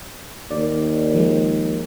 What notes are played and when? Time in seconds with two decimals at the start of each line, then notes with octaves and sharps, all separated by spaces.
0.51 D#2 D5
1.14 F3 G#3